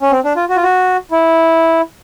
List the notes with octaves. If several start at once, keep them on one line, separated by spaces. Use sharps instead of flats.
C#4
C4
D4
F4
F#4
F4
F#4
E4